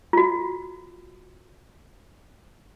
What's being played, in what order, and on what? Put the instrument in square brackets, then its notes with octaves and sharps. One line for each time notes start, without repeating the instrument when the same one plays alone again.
[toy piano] F4 F#4